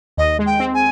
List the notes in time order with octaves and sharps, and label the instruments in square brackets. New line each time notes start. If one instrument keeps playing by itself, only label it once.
[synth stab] D#2 [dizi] D#5
[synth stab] G#3
[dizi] G5
[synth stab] C4
[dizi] G#5